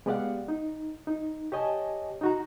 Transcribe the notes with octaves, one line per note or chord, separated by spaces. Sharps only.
G#3 B3 G4 D5 F5 F#5
D#4
D#4
G4 C#5 D#5 G#5 A5
D#4 F#4 A#5